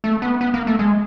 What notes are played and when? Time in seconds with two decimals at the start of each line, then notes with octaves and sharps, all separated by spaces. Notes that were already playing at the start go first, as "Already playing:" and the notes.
0.04 A3
0.22 B3
0.41 B3
0.54 A#3
0.67 A3
0.79 G#3